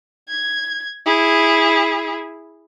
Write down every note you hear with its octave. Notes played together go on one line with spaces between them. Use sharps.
G#6
E4 G#4